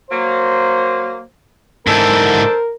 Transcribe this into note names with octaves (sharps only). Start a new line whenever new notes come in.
F#3 A#3 C5
G#2 E3 D4 A4 A#4 C5